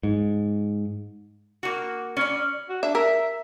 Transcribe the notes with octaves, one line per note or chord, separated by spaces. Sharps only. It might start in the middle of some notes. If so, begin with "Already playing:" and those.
G#2
A#3 F#4
C#4 D5
F#4
D4 E5
A#4 E5